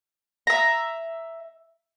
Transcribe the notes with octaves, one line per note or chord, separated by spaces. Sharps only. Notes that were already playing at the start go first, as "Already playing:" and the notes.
E5 A#5